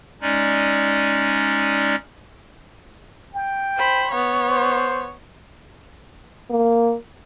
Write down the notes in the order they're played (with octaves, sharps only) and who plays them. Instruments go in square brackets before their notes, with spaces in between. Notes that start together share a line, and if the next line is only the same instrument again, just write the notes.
[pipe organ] G#3 C#4 D#4 D5
[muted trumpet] G5
[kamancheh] C5 B5
B3 C#5
[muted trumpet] C5
[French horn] A#3